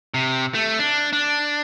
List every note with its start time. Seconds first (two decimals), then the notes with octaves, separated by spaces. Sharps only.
0.14 C3
0.55 A3
0.79 D4
1.13 D4